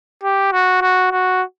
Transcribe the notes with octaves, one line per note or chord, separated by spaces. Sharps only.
G4
F#4
F#4
F#4